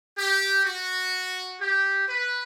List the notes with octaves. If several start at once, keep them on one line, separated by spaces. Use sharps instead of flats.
G4
F#4
G4
B4